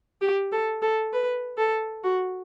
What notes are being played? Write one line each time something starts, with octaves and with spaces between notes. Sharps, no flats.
G4
A4
A4
B4
A4
F#4